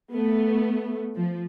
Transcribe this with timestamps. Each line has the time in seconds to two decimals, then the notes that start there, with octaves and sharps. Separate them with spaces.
0.12 A3 B3
1.15 F3